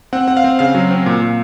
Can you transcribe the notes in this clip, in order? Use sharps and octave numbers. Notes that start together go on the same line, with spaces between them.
C4 F#5
C4 F#5
F5
C4
C#3 F5
F#3
C4
A#2
A#2